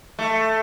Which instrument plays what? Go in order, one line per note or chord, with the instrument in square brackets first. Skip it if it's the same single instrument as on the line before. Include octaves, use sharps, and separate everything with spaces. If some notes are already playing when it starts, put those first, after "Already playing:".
[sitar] A3